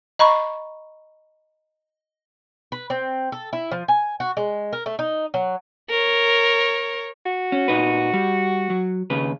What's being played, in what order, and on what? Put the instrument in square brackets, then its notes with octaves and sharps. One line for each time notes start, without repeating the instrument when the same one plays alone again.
[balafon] D#5 A#5 B5 C#6
[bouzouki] B4
C4
A4
E4
F3
G#5
F#4
G#3
A#4
A3
D#4
F#3
[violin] A#4 C#5
[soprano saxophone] F#4
[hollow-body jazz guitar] C#4
A#2 D#4 B4
G3
F#3
D#2 C#3 B4